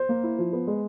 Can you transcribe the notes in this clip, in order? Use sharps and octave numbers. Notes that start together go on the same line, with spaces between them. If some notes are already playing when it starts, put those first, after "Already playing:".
Already playing: C5
A#3
E4
F3
B3
G#3